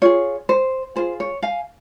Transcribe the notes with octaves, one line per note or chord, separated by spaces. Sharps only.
F4 G#4 C#5
C5
F4 G#4 C5
C#5
F5 G#5